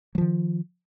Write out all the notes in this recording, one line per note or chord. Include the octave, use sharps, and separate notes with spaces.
D#3 F3 F#3